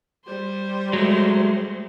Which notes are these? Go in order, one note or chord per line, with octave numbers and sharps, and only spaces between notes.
G3 C5
F#3 G#3 A3